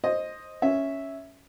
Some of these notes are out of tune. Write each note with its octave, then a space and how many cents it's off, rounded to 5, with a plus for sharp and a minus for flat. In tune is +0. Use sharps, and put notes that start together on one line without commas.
C5 +15 D#5 +0
C#4 +0 E5 -5